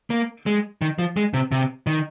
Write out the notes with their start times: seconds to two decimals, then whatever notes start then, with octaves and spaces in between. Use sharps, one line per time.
0.10 A#3
0.46 G#3
0.82 D#3
0.99 F3
1.17 G#3
1.34 C3
1.52 C3
1.87 D#3